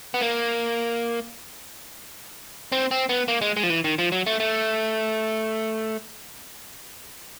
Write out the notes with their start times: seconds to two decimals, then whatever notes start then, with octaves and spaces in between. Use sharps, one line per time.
0.14 B3
0.21 A#3
2.72 C4
2.91 C4
3.09 B3
3.28 A#3
3.41 G#3
3.57 G#3
3.63 F3
3.70 E3
3.84 D#3
3.99 F3
4.12 F#3
4.26 A3
4.40 A3